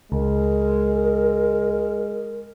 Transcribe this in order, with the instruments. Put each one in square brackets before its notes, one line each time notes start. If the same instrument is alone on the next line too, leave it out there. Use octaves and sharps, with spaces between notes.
[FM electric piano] C#2 [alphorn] G#3 [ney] A#4